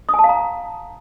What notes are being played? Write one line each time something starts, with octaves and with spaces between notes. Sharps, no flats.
D#6
G#5
A5
F5
A#5